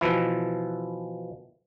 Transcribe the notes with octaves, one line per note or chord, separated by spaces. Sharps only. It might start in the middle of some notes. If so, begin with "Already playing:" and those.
B2 E3 F3 E4